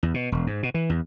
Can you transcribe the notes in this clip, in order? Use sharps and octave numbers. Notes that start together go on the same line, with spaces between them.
E2
B2
E1
G#2
B2
E3
E2